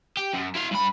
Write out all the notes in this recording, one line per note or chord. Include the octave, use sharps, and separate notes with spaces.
G4
F#2
E4 F5
G2 B5